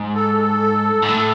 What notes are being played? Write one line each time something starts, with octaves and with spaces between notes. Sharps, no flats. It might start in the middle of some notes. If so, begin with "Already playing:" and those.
Already playing: G#2
A4
G#2
A2